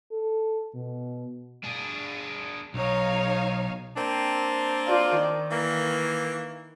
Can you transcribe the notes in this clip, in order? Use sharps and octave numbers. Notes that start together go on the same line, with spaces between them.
A4
B2
D4 G#4
B1 D#4 C#5 F5
A#3 C4 D4
F4 D5
D#3
E3 A#3